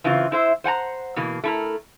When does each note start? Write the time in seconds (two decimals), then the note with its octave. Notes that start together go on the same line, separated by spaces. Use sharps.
0.04 C#3 E3 C4 F4
0.32 E4 C5 E5
0.64 C5 F#5 G#5 A#5
1.16 B2 E3 A#3
1.44 A3 E4 A#4